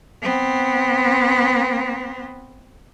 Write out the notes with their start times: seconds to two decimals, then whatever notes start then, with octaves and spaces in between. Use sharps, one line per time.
0.21 B3 C4